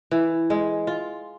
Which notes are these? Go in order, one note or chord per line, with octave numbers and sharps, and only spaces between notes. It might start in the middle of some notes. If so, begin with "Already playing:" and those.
E3
G#3
F4